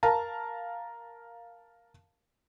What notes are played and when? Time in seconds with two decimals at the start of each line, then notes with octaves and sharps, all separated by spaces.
0.03 A#4 F5 A5 A#5